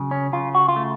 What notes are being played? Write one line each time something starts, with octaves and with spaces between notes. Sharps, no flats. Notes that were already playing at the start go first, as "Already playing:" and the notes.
Already playing: C#3 F#3
C#4
C#3 F4
F#4
F4
A3